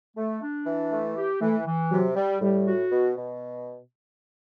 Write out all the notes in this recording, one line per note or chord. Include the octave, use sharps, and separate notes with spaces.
A3
D4
E3
A3
G4
E3 A3
E3
C3 F#3
G3
A2 G3
F#4
B2
B2